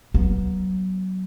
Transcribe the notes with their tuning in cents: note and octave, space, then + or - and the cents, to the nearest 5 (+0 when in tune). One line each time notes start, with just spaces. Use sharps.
F#3 +20 B3 -25